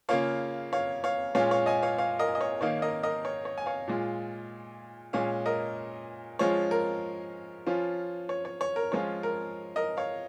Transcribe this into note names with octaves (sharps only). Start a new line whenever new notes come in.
C#3 A#3 F4 C#5 F5
C#5 F5
C#5 F5
A#2 G#3 C#4 F4 C#5 F5
C#5 F5
D#5 G#5
C#5 F5
C#5 F5
A#4 D#5
D#5
C#5
D#3 A#3 D#4 C#5 F5
A#4 D#5
A#4 D#5
C#5
C#5
G#5
C#5 F5
A#2 G#3 F4
A#2 G#3 C#4 C#5 F5
A#4 D#5
F3 G#3 C#4 F4 C#5
A#4
F3 C#4 F4
C#5
C#5
C#5
A#4
F3 G#3 C#4 F4 C#5
A#4
A#4 D#5
C#5 F5